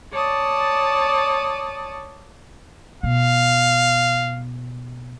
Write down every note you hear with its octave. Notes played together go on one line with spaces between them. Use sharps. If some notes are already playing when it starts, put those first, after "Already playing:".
C#5 D5 A5 D#6
B2 F5